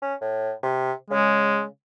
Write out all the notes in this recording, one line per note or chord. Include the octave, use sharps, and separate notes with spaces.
C#4
A2
C3
C#3 G#3